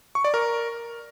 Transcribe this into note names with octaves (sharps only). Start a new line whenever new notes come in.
C#6
D5
A#4